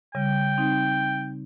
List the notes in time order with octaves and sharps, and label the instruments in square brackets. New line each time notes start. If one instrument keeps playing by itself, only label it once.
[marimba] C#3 G3 [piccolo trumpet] G5
[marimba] C4 D#4